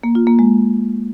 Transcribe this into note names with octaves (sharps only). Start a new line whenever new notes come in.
A#3
F4
A#3
G#3